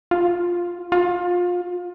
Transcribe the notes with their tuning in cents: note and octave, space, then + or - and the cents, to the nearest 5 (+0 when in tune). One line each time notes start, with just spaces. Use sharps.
F4 +5
F4 +25